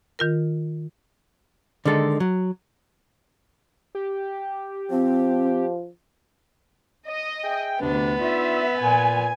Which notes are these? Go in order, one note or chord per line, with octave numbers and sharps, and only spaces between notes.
D#3 F4 A#4
D3 D#3 G#3 A4
F#3
G4
F3 C4
D#5
G#4 E5 G5
D2 C3 B3 D4
D4 D#4 F4 E5
A#2 G#5